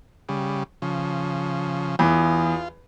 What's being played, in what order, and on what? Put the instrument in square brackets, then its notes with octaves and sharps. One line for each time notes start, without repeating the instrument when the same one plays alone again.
[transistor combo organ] C#3 G3
C#3 F3
[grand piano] E2 [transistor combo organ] F4